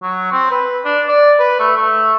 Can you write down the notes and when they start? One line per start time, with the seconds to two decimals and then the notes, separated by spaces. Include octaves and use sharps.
0.03 F#3
0.32 C4
0.51 B4
0.85 D4
1.09 D5
1.39 B4
1.60 A3
1.76 A3